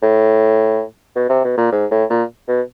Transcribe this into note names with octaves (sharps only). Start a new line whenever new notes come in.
A2
B2
C3
B2
A#2
G#2
A2
A#2
B2